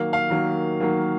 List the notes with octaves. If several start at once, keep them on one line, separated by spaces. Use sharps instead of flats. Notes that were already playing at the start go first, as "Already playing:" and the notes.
Already playing: D#3 F#3 A#3 F5
F5
D#3 F#3 A#3
D#3 F#3 A#3